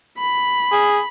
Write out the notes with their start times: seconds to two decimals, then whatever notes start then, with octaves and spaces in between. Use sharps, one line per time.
0.18 B5
0.72 G#4